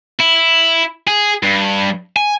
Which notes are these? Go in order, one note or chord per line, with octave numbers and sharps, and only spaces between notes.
E4
G#4
G2
G#5